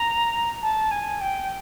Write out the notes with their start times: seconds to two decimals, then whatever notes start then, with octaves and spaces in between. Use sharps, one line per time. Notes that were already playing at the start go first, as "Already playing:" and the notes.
Already playing: A#5
0.62 A5
0.91 G#5
1.21 G5